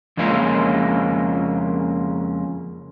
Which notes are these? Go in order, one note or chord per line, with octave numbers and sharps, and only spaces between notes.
F2 C#3 G#3 A#3 C#4 F4